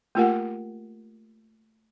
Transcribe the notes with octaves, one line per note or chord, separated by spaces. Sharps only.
A3 A#3 F4 G4 A#4 F#5